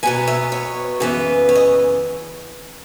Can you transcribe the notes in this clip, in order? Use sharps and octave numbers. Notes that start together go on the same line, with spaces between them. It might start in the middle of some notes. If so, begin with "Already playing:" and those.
B2 F#3 B3 G#5
E5
C#5
F#2 C#3 E3 B3
C#5
D#5